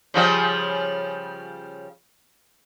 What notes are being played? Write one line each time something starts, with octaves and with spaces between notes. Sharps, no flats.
C#3 F3 G3